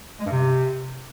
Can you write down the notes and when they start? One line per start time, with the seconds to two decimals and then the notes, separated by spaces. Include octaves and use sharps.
0.20 G#3
0.25 G2
0.31 C3